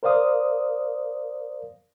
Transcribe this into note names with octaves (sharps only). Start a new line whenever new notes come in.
A#4 C5 D5 F5 D#6